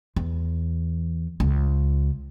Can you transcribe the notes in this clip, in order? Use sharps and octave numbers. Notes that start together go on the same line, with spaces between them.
E2
C#2